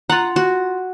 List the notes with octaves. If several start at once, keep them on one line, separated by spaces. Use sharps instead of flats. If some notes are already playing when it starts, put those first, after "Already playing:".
F4 F#5 A#5
F#4